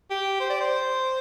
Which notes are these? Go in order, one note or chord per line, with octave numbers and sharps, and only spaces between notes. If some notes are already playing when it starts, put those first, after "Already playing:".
G4
C5
D5
C5